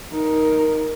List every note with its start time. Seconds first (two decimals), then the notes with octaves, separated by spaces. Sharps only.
0.12 D#4 A#4